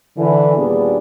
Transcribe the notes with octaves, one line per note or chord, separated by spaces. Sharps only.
D3 E3
D#2 A#2 G3 B3 D4 G#4